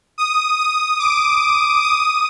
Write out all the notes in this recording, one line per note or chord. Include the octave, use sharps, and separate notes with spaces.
D#6
D#6
D6
D#6